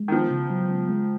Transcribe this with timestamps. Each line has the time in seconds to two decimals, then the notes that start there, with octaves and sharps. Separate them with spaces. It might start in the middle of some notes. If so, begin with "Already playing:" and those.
Already playing: G#3
0.08 D#3
0.12 F3 B3
0.31 C#3
0.50 F#3
0.69 C#3
0.89 G#3